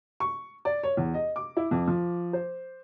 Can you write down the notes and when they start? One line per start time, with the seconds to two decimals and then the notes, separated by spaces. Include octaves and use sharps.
0.20 C#6
0.65 D5
0.83 C#5
0.97 E2
1.14 D#5
1.36 D6
1.57 E4
1.71 F2
1.88 F3
2.33 C5